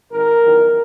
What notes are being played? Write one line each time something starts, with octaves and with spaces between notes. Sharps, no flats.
G#1 G#2 D#3 A#4
E2 D#3 F#3